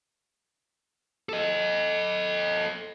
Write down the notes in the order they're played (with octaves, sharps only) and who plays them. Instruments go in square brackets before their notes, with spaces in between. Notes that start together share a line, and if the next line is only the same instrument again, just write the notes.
[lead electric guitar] A4 D#5